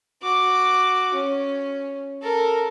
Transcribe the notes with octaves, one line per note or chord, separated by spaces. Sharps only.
F#4 D6
C#4
A4 A#4